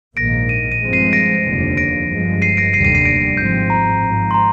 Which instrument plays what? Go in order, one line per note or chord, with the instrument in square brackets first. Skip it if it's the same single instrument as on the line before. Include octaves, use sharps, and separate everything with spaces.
[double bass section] A#1 G#2 D#3 A#3 [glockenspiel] A#6 D7
[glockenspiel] D#7
D#7
[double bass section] G2 F3 G#3 C4
[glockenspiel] C7 D#7
A#6 D7
[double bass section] F1 D#2 D3 F3
[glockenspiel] A#6 D7
[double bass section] G1 G2 F3 G#3
[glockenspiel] C7 D#7
A#6 D7
[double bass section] F1 D#2 D3 G3 [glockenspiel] C7 D#7
[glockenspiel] C7 D#7
C7 D#7
A#6 D7
[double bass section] G#1 G#2 F3 C4 [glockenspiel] G6
[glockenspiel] A#5
[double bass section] G#1 G#2 F3
[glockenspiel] C6
A#5